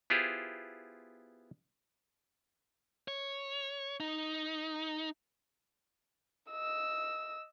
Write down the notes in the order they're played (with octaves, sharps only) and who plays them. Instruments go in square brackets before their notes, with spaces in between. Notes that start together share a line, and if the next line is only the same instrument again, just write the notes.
[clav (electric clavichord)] B3 E4 F4 G4 G#4 C5
[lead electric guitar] C#5
D#4
[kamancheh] D#5 E6